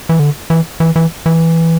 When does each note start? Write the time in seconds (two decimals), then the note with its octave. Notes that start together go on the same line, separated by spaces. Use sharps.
0.09 E3
0.19 D3
0.50 E3
0.80 E3
0.96 E3
1.26 E3